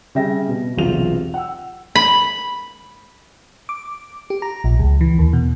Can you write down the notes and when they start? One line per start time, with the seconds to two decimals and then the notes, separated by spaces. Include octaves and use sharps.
0.15 C#3 G3 E5 G5 A#6
0.48 B2
0.77 E1 B1 C3 F4 F#4 F7
1.34 F#5 G5 E6
1.96 B5
3.69 D6
4.30 G4
4.42 A#5
4.64 A#1
4.79 C#2
5.01 E3
5.19 D#2
5.33 B2